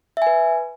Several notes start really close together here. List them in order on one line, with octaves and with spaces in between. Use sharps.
E5 G#5 B4